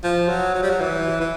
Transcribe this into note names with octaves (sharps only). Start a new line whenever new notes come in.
F3
F#3
F#3
G3
F#3
E3
E3